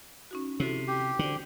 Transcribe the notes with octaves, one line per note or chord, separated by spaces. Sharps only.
C#4 D#4 F#4
C3 E4 F#4 A4
G4
D3 F#4 C5